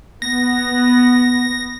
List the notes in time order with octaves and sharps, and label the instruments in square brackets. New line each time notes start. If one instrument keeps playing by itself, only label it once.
[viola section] B3 [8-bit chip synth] A#6